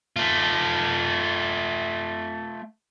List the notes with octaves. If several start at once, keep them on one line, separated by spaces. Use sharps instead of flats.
A3 F4